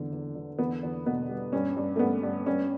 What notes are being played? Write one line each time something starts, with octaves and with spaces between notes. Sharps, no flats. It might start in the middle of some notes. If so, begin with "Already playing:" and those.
Already playing: E2 D3
E2
D3
E2 B3
E2
B2 B3
G3
G2 C#4
G2
A3
G2 B3
G2
G2 C#4